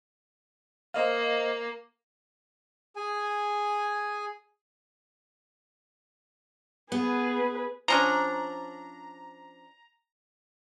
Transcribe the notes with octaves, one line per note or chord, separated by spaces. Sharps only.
A#3 C5 D#5 F5
G#4 G#5
B3 G#4 B4
F3 C#4 D4 A#5